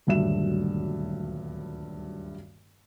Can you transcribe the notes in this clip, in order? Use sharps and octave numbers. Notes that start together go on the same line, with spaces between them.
D#1 D2 G2 F#3 E5 E7